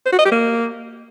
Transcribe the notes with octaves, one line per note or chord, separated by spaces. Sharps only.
C5
F#4
D#5
G4
A#3